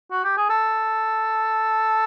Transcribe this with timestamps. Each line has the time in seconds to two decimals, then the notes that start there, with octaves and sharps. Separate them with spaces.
0.11 F#4
0.24 G4
0.37 G#4
0.50 A4